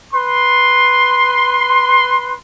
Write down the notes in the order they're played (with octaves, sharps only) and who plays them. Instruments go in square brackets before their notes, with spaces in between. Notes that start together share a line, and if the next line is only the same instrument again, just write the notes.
[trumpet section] B4 C6